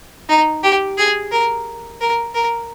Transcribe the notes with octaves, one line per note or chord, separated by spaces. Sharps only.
D#4
G4
G#4
A#4
A#4
A#4